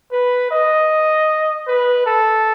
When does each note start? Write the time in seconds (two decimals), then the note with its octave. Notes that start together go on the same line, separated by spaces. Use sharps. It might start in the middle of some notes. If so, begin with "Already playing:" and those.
0.12 B4
0.51 D#5
1.67 B4
2.06 A4